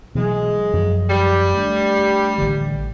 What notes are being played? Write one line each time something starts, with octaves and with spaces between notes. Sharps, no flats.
B2 E3 F#3 G#3
F#2 D#3 F3
G3
A3 D4
A1 D3 E3